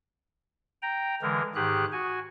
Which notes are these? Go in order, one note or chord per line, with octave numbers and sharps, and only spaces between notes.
G5 A#5
D3 E3 G#3 A#4
G#2 D#3 G4 G#4 F#6
F#4 G#5